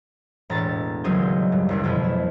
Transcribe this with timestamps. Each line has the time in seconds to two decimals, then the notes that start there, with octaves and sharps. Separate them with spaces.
0.50 E1 A2 A#5 A6
1.04 D#1 C#2 F#3 G#3 D#6 G6
1.52 G2
1.69 F#1 C#2 D3
1.84 F2 B2 B3 E4
2.04 A3